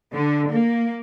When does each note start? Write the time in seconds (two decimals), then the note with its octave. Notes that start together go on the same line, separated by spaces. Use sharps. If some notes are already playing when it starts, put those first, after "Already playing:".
0.13 D3
0.50 A#3